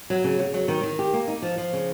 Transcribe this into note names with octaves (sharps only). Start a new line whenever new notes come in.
F#3
C#3
C#3
F#3
D#3
D#3
G4
A#3
D#4
F3
F3
C#3